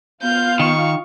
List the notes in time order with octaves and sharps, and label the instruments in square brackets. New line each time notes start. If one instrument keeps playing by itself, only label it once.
[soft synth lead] B3 [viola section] F4 F5 [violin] G6
[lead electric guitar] D#3 [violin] C#6